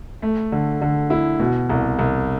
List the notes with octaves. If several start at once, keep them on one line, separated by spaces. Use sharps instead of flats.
A3
D3
D3
E4
B2
C2
C2